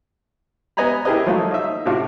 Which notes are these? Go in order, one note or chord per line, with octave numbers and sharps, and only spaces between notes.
B3 D#5 G#5 A#5 B5
E4 G4 G#4 A#4 B4 D#5
F3 F#3 A3 A#3 D#4
D#4 E5
A2 C3 D4 F4 F#4